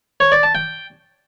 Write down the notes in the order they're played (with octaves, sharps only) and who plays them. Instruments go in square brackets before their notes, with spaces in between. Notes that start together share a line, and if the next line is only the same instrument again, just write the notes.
[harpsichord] C#5
D5
A5
G5